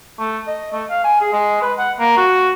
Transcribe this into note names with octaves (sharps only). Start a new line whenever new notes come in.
A3
D#5
A3
F5
G#5
G#4
G#3
B4
F#5
A#3
F#4